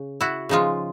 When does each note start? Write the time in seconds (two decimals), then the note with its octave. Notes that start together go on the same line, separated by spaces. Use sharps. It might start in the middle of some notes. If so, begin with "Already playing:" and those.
Already playing: C#3
0.21 E4 F#4
0.49 C#3 F3 G#3 D#4 F4